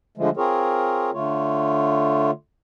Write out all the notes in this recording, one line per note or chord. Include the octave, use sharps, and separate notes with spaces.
D3 F3 G#3 A3
C4 F4 G#4 A#4 C#5
D3 A3 F4 C#5